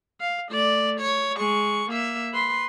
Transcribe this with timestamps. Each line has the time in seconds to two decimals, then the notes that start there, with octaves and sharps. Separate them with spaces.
0.21 F5
0.50 A3 D5
1.00 C#5
1.38 G#3 C#6
1.90 A#3 E5
2.33 B4 C6